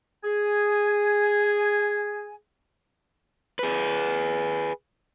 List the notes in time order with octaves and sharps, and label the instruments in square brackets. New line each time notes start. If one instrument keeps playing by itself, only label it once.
[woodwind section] G#4 G#5
[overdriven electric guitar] G#4 B4